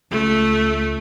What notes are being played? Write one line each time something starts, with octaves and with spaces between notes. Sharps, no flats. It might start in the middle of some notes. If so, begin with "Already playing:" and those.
C#2 A3